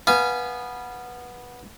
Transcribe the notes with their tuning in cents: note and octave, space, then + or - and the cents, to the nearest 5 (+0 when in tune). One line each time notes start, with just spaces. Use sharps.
B3 -15 F5 -20 G#5 +0